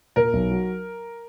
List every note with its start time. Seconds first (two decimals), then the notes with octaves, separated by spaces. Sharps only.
0.16 A#2 A#4
0.33 B1
0.51 F#3